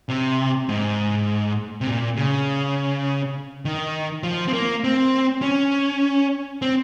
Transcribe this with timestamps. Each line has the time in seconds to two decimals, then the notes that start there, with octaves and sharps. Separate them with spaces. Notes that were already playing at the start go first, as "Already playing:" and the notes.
0.09 C3
0.69 G#2
1.81 C3
1.87 A#2
2.17 C#3
3.65 D#3
4.23 F3
4.48 C4
4.53 A#3
4.84 C4
5.42 C#4
6.62 C4